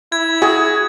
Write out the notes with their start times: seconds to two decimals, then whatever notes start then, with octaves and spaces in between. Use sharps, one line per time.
0.12 E4 G#6
0.42 F#4 G#4